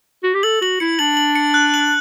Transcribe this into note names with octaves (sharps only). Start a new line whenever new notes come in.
F#4
G4
A4 F#7
F#4 F#7
E4 C#7
D4 F#7
F#7
C#7
F#6
F#7